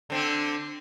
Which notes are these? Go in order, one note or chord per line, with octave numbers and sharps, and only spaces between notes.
D3 C4 D4